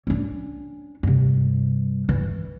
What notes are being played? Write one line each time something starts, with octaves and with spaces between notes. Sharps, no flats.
C#4 D4
G2 C3
E3